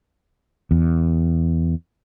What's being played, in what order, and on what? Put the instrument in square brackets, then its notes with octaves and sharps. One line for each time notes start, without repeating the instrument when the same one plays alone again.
[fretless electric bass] E2